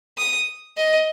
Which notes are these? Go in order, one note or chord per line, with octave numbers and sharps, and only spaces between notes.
D#6
D#5